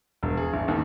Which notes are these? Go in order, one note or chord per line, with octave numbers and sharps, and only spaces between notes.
E1
G#4
A1
D#2